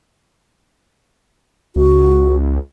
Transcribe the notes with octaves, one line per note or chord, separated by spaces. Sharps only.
C#2 F#4